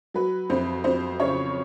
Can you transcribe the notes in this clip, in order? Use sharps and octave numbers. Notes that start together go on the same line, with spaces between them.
F#3 B4
F2 C5
F2 C5
C#3 C#5